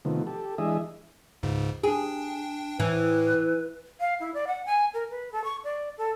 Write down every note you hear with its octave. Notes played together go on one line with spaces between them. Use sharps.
C3 D#3 F3 A3 B3
G4 A4
E3 G#3 D4 G#4 D#5 E5
C#2 G#2 C#3
D4 G#4 G5
A2 E3 B4
F5
E4
D5
F#5
G#5
A#4
B4
A4
C#6
D5
A4